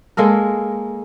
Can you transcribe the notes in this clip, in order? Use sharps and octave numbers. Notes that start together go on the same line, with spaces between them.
G#3 A#3 A4 A#4